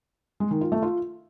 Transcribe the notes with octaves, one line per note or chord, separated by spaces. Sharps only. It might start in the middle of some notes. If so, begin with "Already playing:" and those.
G#3
D#3
F4
A3
F4